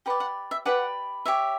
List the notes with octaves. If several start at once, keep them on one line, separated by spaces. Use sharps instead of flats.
G4 B4 D5 F#5
F#5
E5
G4 B4 D5 F#5
G4 C#5 E5